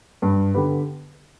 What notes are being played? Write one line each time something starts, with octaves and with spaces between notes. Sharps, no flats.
G2
D3 B3 G4 B4